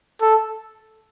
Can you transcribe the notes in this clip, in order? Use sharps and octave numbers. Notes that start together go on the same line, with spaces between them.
A4